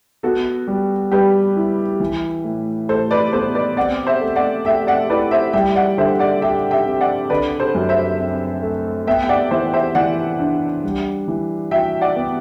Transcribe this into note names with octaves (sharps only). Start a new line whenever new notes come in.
B3 F#4 A4
G3
G3 G4 B4
E4
E3
A2
A2 A4 C5
B4 D5
B3 A4 C5
B4 D5
C4 D5 F#5
C5 E5
A3
D5 F#5
A3 E5 G5
D5 F#5
E4 B4 D5
C5 E5
G3 E5 G5
D5 F#5
D3 C5 E5
D5 F#5
G4 E5 G5
E5 G5
C4
D5 F#5
D3 B4 D5
A4 C5
F#2
C5 E5
C4
A3
B3 E5 G5
G5
D5 F#5
E3 C5 E5
C5 E5
E3 D5 F#5
D4
G3
E3
F#4 E5 G5
D5 F#5
B3